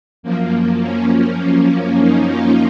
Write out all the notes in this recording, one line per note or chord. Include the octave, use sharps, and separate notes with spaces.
F#2 F3 A#3
C#4
D#4
F4